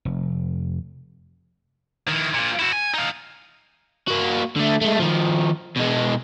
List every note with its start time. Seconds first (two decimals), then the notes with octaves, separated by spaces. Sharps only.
0.05 F1
2.08 D#3 E4
2.34 A#2 F3
2.59 E4 F#4
2.73 G#5
2.94 D#4 F4
4.08 A#3 F#4
4.56 D3 A3
4.81 G#3 A3
4.99 D#3 F3
5.76 B2 G#3